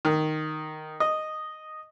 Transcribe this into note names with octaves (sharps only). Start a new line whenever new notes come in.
D#3
D#5